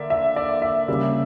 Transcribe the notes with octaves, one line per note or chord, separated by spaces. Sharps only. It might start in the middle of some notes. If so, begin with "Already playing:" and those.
Already playing: D3 A#3 D5 E5
E5
D5
E5
C#3 G3 A#3